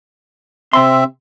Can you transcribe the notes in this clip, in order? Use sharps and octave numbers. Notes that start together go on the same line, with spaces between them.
C3 C4 E5 C6